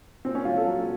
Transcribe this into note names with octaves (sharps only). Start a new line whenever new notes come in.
A#2 C4
C#4
A#1 F4
A4
F#3